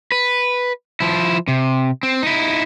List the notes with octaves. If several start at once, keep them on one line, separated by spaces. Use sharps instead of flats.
B4
F3 E4
C3
C4
D#4 E4